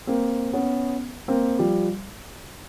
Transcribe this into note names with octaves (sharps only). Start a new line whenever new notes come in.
A#3 C4
B3 C#4
A#3 C4
F3 G3